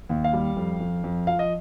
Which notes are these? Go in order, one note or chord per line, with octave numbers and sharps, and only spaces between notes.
D#2
F5
G3
F2
F2
F2
F3 F5
D#5